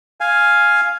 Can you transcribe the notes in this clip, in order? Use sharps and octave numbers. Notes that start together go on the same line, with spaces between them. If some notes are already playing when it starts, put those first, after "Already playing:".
F5 G#5